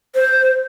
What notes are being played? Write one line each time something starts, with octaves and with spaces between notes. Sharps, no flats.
C5